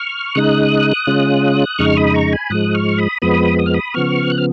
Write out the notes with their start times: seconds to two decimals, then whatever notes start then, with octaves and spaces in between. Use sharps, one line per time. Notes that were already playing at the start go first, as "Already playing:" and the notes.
Already playing: C#6 F6
0.35 C#3 G#3 D#4 D#6 F#6
1.07 C#3 G#3 C#4 F4
1.78 F2 C#3 G#3 D#4 C#6 F6
1.97 B5 D#6
2.14 A#5 C#6
2.33 G#5 B5
2.50 G#2 F3 G#3 D#6 F#6
2.74 C#6 F6
2.98 B5 D#6
3.22 F2 F3 G#3 B3 B5 D#6
3.59 D#6
3.66 F6
3.74 B5 D#6
3.94 C#3 F3 B3 C#6 F6
4.30 F#6
4.38 F6